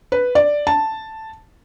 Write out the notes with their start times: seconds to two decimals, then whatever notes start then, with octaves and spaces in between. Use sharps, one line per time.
0.12 B4
0.35 D5
0.67 A5